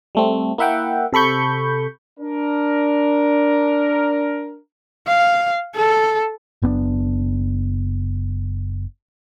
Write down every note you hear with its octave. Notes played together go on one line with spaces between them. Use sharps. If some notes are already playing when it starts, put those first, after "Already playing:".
G3 A3 C4
A#3 E4 E5 F#5 G5
C3 A4 B5 C#6 G6
D4 A#4
F5
A4
F#1 B3 C4 D4